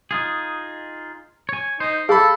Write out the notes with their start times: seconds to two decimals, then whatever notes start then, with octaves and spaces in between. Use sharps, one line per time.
0.11 D#4 F4 G#4
1.49 C#5 G#5
1.80 D#4 C5
2.09 G#4 A4 F5 B5